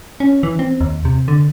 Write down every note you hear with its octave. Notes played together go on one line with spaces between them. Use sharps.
C#4
E3
C4
D#2
C3
D3